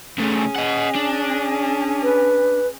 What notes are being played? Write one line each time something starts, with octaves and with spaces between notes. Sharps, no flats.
C#3 A3 C#4 G#4
D#5 F#5
D4
B4